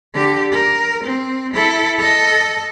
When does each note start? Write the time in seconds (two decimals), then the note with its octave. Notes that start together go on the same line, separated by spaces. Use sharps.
0.14 D3 G4
0.52 A#4
1.04 C4
1.54 E4 A4
1.99 A4 D#5